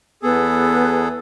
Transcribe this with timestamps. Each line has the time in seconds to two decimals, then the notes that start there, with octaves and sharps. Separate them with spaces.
0.23 E2 B3 G#4 A4